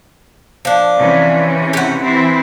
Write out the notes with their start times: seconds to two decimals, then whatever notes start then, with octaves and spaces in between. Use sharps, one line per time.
0.65 F3 D4
0.98 C3 E3 C#4
1.73 G4 F#5
2.02 E3 C4 E4